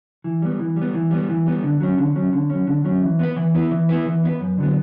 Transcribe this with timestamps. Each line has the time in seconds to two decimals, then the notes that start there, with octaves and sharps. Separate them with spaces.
0.24 E3
0.42 G3 B3
0.59 E3
0.76 G3
0.81 B3
0.94 E3
1.11 G3 B3
1.29 E3
1.46 G3 B3
1.63 D3
1.80 F#3 C#4
1.98 D3
2.15 F#3 C#4
2.33 D3
2.50 F#3 C#4
2.67 D3
2.84 F#3 C#4
3.02 E3
3.19 B3 E4 B4
3.36 E3
3.54 B3 E4 B4
3.71 E3
3.89 B3 E4 B4
4.06 E3
4.23 B3 E4 B4
4.40 F#2
4.58 D3 F#3 B3